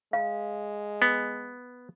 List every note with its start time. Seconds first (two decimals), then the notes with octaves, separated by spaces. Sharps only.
0.13 G#3 F5
1.02 B3